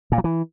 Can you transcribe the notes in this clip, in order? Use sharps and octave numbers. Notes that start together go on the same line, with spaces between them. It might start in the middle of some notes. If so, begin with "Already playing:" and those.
A#2
F#3
E3